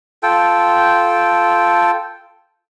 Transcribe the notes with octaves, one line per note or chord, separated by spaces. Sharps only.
F4 A4 G5